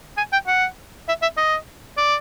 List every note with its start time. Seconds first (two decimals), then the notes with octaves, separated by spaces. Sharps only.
0.17 G#5
0.33 G5
0.47 F#5
1.08 E5
1.22 E5
1.37 D#5
1.97 D5